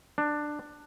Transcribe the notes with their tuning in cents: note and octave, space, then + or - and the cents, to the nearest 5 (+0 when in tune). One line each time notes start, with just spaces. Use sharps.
D4 +15